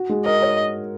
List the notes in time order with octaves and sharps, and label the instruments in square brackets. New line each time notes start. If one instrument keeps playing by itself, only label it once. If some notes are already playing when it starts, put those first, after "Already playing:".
Already playing: [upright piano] F#4
G#3
[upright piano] A#4 [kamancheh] D#5
[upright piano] C#5